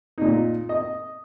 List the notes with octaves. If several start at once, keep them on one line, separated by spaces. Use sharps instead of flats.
A#2 D#4
D#5